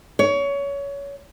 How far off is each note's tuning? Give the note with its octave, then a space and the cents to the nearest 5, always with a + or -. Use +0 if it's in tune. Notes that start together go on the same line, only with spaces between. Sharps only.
C#5 +25